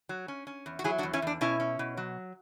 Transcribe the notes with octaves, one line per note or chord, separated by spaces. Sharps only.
F#3
C#4
C#4
E2
F#4
F#3 E4 G#4
D4 F#4
E2
C#4 E4
E2 D4
B2 C#4 E4
C#4
B2
F#3